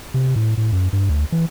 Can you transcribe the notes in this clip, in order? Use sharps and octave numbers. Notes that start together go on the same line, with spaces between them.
C3
A2
A2
F#2
G2
D2
E3